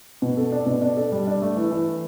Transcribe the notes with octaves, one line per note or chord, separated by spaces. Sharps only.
B2
A4
D4
B2
D4
A4
G3
D4
A3
E3
E3